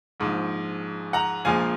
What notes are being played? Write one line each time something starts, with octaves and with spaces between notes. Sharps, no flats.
A#1 G#2 F3
F#5 A#5
A#1 A#2 F3 G#3 F5 G#5